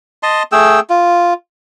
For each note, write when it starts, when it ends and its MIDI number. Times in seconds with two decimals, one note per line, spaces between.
0.23 0.43 75
0.23 0.43 81
0.23 0.43 84
0.52 0.80 57
0.52 0.80 68
0.52 0.80 79
0.52 0.80 88
0.90 1.34 65